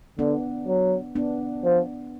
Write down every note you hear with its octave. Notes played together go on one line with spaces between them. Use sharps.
D3 B3 D4
F#3
B3 D4
F3